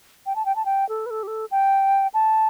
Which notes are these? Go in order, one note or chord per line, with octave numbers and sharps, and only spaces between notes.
G5
A5
G5
A5
G5
A4
B4
A4
G4
A4
G5
A5